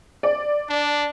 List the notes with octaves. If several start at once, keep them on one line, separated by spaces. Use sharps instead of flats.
D5
D4